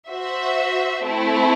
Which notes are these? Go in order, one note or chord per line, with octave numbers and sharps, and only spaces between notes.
F#4 C5 E5
A3 C4 E4